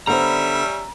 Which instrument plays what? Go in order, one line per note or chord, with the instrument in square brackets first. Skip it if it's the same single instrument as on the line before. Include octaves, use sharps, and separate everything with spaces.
[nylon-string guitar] D3 B3 C5 [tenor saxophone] G3 [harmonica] C#4 E5 [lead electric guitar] A#5